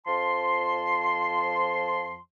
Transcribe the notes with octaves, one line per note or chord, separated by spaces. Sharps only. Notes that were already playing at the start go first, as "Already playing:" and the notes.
F2 F3 A5 C6